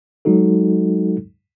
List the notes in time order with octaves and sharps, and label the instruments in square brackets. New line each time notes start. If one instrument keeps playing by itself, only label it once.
[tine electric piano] F#3 G#3 D#4 F#4 A4